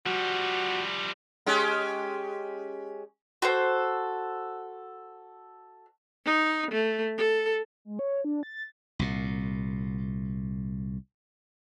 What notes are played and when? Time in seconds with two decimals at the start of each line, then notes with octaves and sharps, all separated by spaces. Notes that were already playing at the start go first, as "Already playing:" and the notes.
0.06 F3 G3 F#4
1.46 G#3 C#4 G4
3.42 F#4 A4 C5
6.25 D#4
6.71 A3
7.17 A4
7.85 G#3
7.99 C#5
8.24 D4
8.43 A6
8.99 C2 A#2